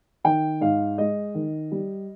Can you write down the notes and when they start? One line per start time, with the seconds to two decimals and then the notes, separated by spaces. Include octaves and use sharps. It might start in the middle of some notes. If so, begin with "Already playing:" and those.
0.24 D#3 G5
0.61 G#2 F5
0.98 G#3 D#5
1.34 D#3
1.72 G3